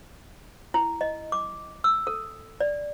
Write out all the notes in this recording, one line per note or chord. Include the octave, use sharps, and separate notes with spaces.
E4
D#5
D6
E6
A4
D5